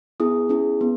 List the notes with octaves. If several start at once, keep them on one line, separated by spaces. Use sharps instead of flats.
B3 E4 G#4 D#6
C#4 E4 G#4
B3